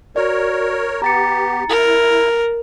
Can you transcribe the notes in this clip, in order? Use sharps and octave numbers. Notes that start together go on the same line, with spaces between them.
F#4 A#4 C#5 D5
B3 G4 A#5 A6 C#7
E4 A#4